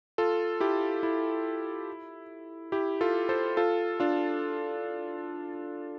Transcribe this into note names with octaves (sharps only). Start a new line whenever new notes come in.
F4 A4
E4 G4
E4
E4 G4
F4 A4
A4 C5
F4 A4
D4 F4